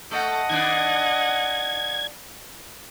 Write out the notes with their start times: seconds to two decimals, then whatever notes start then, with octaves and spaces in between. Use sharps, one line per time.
0.11 A3 A4 D#5 F#5
0.50 D#3 B3 D4 G#6